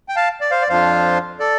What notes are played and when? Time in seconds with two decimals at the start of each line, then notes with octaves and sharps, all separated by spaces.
0.09 G5
0.16 F5 A5
0.41 D5
0.51 C5 F5
0.62 D5
0.69 F2 F3 D4 F4 C5 F5
1.40 A4 D5